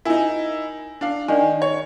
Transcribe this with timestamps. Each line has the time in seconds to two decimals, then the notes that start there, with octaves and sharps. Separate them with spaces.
0.05 D#4 E4 A#4 G#5
1.01 D4 F5
1.28 D#3 D5 D#5 G#5
1.62 C#5